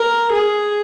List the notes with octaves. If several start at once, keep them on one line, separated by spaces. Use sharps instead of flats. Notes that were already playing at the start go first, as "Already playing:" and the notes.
Already playing: A#4
G#4